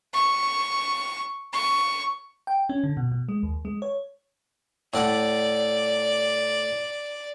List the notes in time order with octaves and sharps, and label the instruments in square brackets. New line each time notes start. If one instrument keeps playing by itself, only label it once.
[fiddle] C#6
C#6
[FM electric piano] G5
C#4
D3
B2
B2
G#3
D#2
G#3
C#5
[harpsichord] A2 A4 F#5 [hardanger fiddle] D5